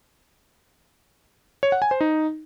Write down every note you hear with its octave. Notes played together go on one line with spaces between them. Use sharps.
C#5
F#5
G#5
C5
D#4